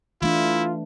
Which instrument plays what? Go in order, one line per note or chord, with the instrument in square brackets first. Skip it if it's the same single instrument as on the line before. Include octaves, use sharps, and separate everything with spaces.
[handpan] E3 A3 D4 [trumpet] E4 [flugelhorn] F4